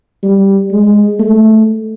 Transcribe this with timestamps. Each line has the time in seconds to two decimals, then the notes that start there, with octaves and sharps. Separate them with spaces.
0.23 G3
0.72 G#3
1.20 A3